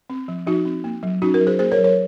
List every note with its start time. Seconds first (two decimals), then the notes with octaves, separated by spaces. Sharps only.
0.10 C4
0.28 F3
0.47 F3 D#4 F#4
0.66 C4
0.84 A#3
1.03 F#3
1.22 C#4 D#4 F#4
1.34 F#4 A#4
1.41 F#3
1.47 G#4 C5
1.59 A#3 G#4 C5
1.72 A#4 C#5
1.78 F#3
1.84 A#4 C#5